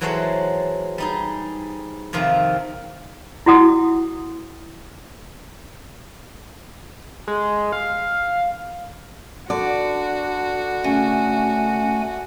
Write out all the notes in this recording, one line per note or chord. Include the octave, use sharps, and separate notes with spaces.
E3 F#3 G#3 A4 C5 C#5
G3 D#4 G#4
F2 C3 D#3 F4
E4 F#4 F#5 D#6
G#3
F5
D3 F#4 D5
C#3 A3 G#5